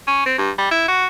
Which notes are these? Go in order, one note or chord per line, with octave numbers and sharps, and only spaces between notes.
C#4
C4
G2
G3
E4
F#4